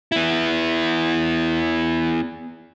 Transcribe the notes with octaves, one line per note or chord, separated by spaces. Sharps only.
B3 E4